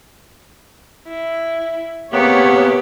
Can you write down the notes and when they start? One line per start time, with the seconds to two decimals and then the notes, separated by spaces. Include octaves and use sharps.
1.07 E4
2.12 C3 A#3 B3 G4 G#4 C#5